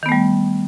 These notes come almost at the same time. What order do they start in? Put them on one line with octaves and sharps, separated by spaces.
D#3 B3 A3 G3